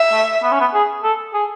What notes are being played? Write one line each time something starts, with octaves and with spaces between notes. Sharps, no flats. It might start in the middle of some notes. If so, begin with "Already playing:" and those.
Already playing: E5
A3
B3
C#4
B3
G#4
A4
G#4